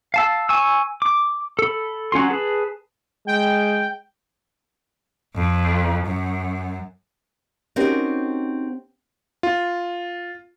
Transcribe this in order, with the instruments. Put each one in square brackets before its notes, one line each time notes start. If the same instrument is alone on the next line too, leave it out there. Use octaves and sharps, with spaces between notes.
[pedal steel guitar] F5 A5 E6
G#5 C#6 E6
D6
A4 B5
F#3 C#4 F4 C6
G#4 B4 A5
[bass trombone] G#3 [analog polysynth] G5
[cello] F2
F#2
[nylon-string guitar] C4 C#4 D#4 F#4 G4 A#4
[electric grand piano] F4